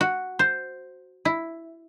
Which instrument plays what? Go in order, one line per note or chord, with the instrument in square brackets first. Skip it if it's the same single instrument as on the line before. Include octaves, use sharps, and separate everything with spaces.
[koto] F#4
C5
E4